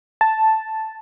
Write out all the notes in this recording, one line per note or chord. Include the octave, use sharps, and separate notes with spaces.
A5